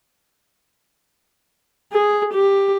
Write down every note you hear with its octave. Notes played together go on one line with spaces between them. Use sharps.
G#4
G4